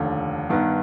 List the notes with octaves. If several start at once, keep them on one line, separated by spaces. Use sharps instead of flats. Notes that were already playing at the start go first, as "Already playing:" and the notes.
Already playing: F1 D#2 D3
G2 D#3 B3